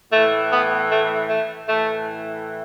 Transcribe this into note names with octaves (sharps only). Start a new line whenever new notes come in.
A2 E3 A3
B3
A3
A3
A2 E3 A3